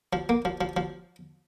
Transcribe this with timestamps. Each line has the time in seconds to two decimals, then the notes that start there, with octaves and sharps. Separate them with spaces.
0.13 F3
0.29 A#3
0.45 F3
0.61 F3
0.77 F3